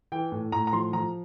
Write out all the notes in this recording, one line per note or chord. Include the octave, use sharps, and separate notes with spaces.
E3 G5
A2
A2 A#5
A#5
F3 C6
F3 A#5